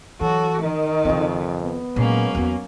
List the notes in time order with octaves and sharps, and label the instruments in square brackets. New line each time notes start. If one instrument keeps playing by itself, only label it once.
[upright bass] E3 [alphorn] F#3 [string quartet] F#4 [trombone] A4
[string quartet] D#3 [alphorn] D#4 [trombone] A#4
[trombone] F2 [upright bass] C#3 C4
[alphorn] B3
[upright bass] A#2 [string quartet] F#3 A#3 C#4 [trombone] G#3
[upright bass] E2 B3 [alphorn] F#4